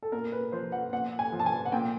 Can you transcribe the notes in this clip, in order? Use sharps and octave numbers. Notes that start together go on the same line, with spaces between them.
A4
A#2 A#4
B4
F3 C5
F#5
A#2 F#5
G#5
F3
A5
G#5
F#5
A#2 G5